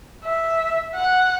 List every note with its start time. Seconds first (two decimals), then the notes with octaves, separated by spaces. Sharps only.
0.25 E5
0.95 F#5